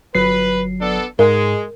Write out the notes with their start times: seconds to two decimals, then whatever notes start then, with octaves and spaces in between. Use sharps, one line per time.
0.15 G1 F#3 B4 C7
0.80 B3 D4 A4
1.19 G#2 G#3 A#4